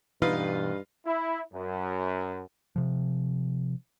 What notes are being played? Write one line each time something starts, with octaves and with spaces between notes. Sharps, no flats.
G2 B2 E3 B3 D#4 F4 B4
E4
F#2
C3 F3